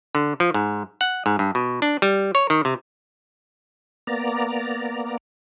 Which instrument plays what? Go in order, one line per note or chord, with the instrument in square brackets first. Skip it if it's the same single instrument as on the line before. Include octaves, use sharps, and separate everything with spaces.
[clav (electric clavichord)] D3
F3
G#2
F#5
G#2
G2
B2
D4
G3
C#5
D#3
C3
[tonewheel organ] A#3 B3 D5 A#5